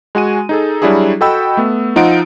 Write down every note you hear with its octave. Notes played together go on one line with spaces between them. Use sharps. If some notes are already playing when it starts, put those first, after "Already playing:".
G#3 F#4 G#5 D#7
D#4 G#4 A4
F#3 G3 D4 E4 F#4 G#4
F#4 A4 D#5 G5 B5 E6
A3 B3
F3 D#4 F4 F#5 D7